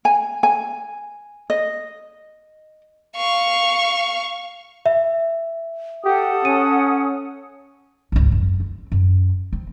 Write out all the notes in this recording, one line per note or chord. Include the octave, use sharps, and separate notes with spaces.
G#5
G#5
D#5
F5 C#6
E5
G4 A4 F#5 D#6
C#4 D#7
G#1 C#2
F#2
C4
F#2
C4